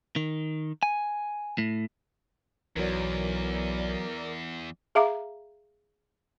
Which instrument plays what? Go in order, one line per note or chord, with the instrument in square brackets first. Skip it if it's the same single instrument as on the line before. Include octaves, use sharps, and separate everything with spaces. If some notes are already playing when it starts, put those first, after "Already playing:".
[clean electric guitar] D#3
G#5
A2
[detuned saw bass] B1 [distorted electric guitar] E2 [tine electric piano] E3 F#3 [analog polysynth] A#4 D5
[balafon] G#4 E5 F5 A#5 D6